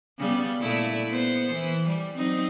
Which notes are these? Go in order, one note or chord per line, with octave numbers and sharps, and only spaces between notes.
C#3 G3 B3
A#2 A3 E4
B3 C5
E3
G3
F#3 C4 D#4